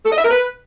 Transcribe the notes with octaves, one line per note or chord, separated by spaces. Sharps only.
A4
D#5
E5
A#4
B4